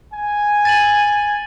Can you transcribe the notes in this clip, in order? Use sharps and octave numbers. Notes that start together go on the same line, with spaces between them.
G#5
A6 D#7 F#7